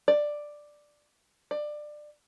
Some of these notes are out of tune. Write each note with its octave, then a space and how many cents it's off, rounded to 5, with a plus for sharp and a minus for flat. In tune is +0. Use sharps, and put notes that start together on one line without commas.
D5 +5
D5 +20